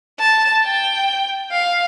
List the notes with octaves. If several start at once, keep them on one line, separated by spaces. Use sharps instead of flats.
A5
G5
F5